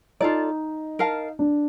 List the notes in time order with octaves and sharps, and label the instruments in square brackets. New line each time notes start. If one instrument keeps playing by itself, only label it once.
[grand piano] D#4 [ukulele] F4 A4 D5
[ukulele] A#4 F5 A5
[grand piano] D4